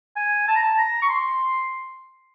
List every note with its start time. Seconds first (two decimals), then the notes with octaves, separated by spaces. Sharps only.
0.16 G#5
0.48 A5
0.55 A#5
0.62 A5
0.77 A#5
1.02 C#6
1.09 C6